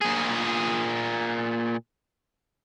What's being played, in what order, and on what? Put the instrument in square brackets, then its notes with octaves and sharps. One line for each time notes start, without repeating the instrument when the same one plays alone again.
[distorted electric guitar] A#2 G#4